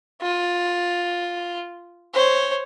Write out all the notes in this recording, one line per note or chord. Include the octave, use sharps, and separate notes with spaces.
F4
C5 C#5